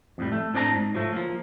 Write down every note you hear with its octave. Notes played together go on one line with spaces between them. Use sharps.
F2 A2 G3
A3
A2 C4 D4 D5 A5 A#5
G#2
F3 F#3 A3
F3 A#3